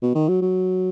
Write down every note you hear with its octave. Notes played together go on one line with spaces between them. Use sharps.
B2
D#3
F#3
F#3